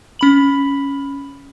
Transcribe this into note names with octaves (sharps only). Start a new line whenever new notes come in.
C#4 B5 F#7